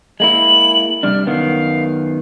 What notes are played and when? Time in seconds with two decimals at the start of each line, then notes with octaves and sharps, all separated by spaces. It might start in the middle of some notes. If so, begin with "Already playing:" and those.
0.20 G#3 A#3 E4 F#7
1.03 C3 G3 D4 F6
1.27 F#2 D#3 B3 F5